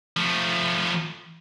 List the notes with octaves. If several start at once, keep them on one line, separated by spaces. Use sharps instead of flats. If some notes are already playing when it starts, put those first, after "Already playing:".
F3 A3